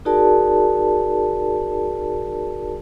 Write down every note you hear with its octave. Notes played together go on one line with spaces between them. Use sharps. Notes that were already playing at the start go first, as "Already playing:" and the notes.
D#4 F#4 G#4 A#4 D5 A5